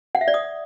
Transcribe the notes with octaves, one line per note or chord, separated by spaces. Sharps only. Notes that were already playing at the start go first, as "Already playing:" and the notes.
F#5
E5
D5
D#6